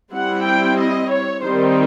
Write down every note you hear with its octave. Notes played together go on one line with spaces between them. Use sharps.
G3 C4 E4 F#5
G5
D#5
C#5
D#3 G3 C4 D#4 C5